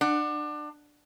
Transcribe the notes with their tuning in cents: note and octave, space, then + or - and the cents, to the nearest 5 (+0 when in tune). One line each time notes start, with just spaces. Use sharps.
D4 +25 F#5 +0